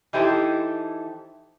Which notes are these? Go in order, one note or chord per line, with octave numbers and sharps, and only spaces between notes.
E3 D#4 E4 G4 A4 C5